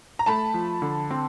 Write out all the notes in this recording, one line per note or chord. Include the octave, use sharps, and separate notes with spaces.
A#5
A3 A5 B5
F3
D3
C4